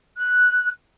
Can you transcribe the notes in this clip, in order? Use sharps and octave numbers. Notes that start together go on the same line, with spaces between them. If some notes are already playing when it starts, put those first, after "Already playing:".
F#6